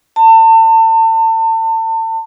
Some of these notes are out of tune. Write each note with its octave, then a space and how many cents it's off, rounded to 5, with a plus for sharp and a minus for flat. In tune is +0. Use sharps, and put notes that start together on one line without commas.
A5 +35